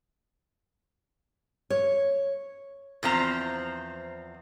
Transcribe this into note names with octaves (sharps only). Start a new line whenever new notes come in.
C#5
E2 F3 C4 A#5